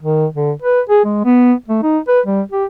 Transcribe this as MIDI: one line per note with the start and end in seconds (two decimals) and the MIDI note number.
0.03 0.26 51
0.35 0.51 50
0.62 0.80 71
0.89 1.02 68
1.05 1.21 56
1.25 1.53 59
1.68 1.81 57
1.83 1.98 63
2.08 2.20 71
2.26 2.42 55
2.52 2.65 67